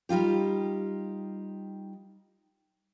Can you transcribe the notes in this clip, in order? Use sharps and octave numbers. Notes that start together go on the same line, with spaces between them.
G3 D#4 F4 G4